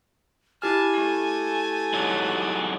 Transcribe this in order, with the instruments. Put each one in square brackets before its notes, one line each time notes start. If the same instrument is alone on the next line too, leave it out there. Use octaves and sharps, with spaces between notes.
[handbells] E4 G4 F6 [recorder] G#5 [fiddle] A5
[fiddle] A3
[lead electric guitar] G#2 F#3